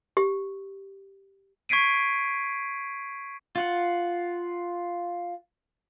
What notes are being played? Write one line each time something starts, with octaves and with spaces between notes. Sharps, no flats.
G4
C#6 G#6 B6 C7 D7 D#7
F4 F#5